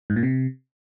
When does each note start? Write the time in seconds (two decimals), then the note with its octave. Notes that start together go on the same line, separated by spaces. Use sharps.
0.10 G#2
0.16 A#2
0.23 C3